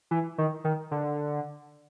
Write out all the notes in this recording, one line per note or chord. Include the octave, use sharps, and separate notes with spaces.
E3
D#3
D#3
D3